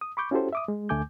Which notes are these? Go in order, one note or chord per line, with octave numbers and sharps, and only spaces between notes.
D#6
B5 C#6 D6 G6
C#4 E4 F#4 G4 A4 C5
E5 D6 D#6
G#3
D2 D3 A3 G#5 D6 G6